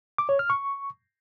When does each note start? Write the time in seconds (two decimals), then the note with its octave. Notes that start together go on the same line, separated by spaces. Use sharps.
0.18 D6
0.29 C#5
0.39 F6
0.50 C#6